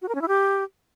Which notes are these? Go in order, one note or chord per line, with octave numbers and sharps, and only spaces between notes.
F#4
A#4
C#4
E4
G4